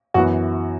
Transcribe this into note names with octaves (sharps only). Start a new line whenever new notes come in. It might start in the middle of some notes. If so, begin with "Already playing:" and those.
F#2 E3 B3 F#4